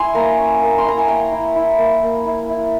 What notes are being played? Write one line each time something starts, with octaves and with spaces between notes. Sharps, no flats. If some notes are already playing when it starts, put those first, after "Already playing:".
Already playing: E4 G#5 C6
A#3 A#5
C#4
A#3
C6
E4 A#5
G#5
A#3 G5
E4
E4
A#3
A#3
E4
E4